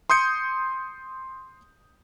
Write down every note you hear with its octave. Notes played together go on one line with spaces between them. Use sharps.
C6 D#6 G6 C#7